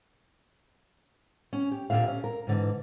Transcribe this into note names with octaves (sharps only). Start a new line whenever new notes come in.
C#4
G4
D2 A#2 D3 G4 E5 F5
C#4
A#4
G#2 D3 E3